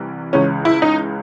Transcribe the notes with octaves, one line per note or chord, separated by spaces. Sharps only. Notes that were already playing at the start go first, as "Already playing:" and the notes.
Already playing: C2 C3 E3
C#2 C#3 E3 C#4
E4
D#4